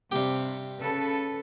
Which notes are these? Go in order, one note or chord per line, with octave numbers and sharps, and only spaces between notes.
G2 C3 G4
C#3 A4 B4